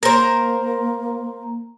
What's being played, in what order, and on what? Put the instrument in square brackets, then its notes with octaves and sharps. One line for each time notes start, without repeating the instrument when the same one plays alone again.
[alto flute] A#3 [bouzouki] A#4 C5